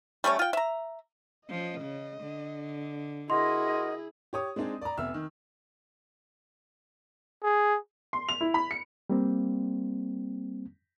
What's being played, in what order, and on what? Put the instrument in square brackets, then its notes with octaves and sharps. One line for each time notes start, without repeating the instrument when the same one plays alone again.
[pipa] G3 A3 C#4 C#5
F4 G5
E5 A#5
[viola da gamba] F3 C#4 [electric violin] D#5
[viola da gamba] C#3
D3
[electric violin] E4 G#4 [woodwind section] F#4 A#4 D#5 [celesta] C6
[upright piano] G4 C#5 D#6
G#3 C4 D4 D#4 G#4
D5 A#5
F1 B3 E5 E6 F6
D#3
[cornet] G#4
[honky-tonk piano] C6
F7
E4
B5
C#7
[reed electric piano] G3 A#3 C4